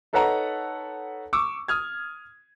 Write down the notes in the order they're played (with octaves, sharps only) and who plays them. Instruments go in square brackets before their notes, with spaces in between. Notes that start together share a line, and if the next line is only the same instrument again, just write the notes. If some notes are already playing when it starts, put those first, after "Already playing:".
[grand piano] D#4 A4 B4 C#5 F#5 A#5
C#6 D6 E6
D#6 F6 G#6